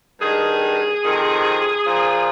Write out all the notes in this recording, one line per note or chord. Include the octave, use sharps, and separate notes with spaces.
G2 D#3 G#4
F2 C3 D#3
A#2 F3